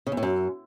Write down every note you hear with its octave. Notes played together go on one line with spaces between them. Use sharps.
C#3
E2
A2
F#2